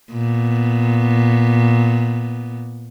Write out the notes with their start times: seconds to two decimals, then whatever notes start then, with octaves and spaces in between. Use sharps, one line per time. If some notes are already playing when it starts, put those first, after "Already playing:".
0.12 A#2 B3